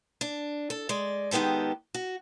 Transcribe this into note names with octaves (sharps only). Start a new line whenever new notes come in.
D4
A4
G#3 D5
D#3 G#3 B3 G4 A4
F#4